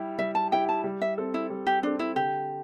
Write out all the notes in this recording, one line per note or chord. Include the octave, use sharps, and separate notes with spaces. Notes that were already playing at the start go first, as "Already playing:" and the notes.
Already playing: G3 E4 G4
G3 E5
A5
E4 G4 G5
A5
G3
E5
C4 A4
E4
G3
G4
C4 D4 A4
E4
D3 G4